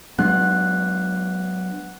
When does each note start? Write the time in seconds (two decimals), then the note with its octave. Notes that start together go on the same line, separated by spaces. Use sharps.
0.18 F#3 G#3 B3 D4 F#5 F#6